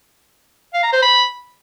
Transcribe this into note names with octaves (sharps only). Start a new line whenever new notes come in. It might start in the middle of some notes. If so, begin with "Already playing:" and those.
F5
A#5
C5
B5